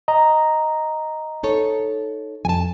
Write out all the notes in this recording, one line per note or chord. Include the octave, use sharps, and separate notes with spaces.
D#5 A#5
D#4 A4 C#5
F2 G#5 A5